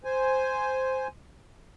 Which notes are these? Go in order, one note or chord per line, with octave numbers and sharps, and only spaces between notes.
C5 G#5